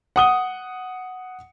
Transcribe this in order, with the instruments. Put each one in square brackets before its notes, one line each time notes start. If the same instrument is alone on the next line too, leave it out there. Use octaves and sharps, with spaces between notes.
[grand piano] F#5 D#6 G7